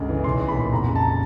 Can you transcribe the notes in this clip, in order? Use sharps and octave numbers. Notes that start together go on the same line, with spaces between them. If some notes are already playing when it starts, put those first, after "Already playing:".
Already playing: G1 C#2 C#3
E3
B1 C6
B1
B5
A#2
F1 A#5
C#3
A5
A#5
A5